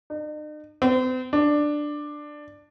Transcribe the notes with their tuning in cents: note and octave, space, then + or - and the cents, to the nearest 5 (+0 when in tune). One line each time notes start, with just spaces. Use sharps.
D#4 -45
C4 -40
D4 +10